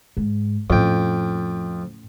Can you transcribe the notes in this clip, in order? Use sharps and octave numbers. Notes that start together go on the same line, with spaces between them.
G#2
F2 A2 C#4 G5